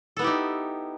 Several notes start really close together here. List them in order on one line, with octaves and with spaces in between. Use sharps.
A4 B3 E4 G4 D#4